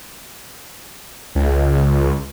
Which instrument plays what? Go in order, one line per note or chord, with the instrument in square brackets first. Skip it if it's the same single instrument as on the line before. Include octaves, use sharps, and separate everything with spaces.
[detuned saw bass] C#2